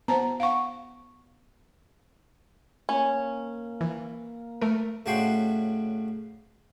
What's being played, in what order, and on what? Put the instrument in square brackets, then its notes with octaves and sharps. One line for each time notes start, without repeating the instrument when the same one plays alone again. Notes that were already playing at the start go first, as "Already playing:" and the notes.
[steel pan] B3 [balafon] C5 A5 A#5
[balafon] F5 F#5 C#6
[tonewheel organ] A#3 [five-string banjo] C#4
[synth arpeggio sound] E3
A3 A#4
[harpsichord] A2 C#3 D4 F#4 G5 C6